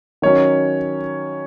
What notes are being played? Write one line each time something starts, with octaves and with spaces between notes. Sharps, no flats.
D#3 F#3 C#4 C#5